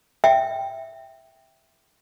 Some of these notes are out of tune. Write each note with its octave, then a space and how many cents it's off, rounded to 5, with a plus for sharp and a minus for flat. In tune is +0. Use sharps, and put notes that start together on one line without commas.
E5 +0 G5 +0